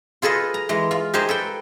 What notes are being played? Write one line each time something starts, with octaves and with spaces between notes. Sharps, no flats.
F4 G#4 A4 B4 D#5
A#5
E3 G#3 A#5
F4
D#4 G4 G#4 A#4 C5 D#5
A4 B4 G5